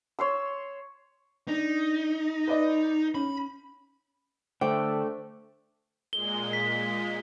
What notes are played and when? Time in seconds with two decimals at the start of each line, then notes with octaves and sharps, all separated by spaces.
0.19 C#5 C6 E6
1.48 D4 D#4
2.47 B4 D5 D#5
3.15 C#4 B5
4.61 D3 A3 C5 G5
6.13 A#2 G#3 G7
6.53 B6